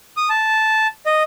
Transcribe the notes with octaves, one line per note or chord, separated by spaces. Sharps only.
D#6
A5
D#5